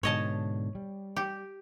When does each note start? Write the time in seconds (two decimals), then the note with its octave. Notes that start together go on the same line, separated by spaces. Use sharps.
0.03 G#2 B2 D3 C#5 D#5 A5
0.75 G3
1.16 G4